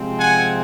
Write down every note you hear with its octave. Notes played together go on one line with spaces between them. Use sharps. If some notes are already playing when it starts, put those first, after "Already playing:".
Already playing: C3 F3 G#3 C4
F#5 G#5